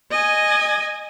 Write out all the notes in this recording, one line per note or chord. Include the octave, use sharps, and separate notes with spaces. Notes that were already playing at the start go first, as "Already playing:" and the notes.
D#5 G#5